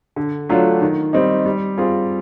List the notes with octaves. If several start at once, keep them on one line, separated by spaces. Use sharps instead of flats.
D3
F#3 A3 D4 F4
D#3
G3 C4 D#4
G3
C4 F4 G#4